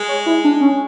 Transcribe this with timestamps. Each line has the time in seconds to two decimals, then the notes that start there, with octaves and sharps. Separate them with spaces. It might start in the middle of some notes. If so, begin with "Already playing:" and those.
Already playing: G#3
0.09 C#5
0.26 E4
0.44 D4
0.61 C#4